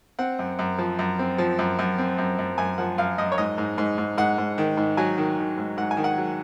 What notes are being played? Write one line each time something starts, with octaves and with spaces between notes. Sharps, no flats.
C4 F#5
F#2
F#2
F3
F#2
C4
F3
F#2
F#2
C4
F#2
F#2
F#2 G#5
F3 F#5
F#2 F5
F#2 D#5
C#5
G#2 D#5
G#2
G#2
G#2
G#2 F#5
G#2
D#3
G#2
F#3 G#5
D#3
D#3
G#2
G#2 F#5
G#5
D#3
F#5
F#3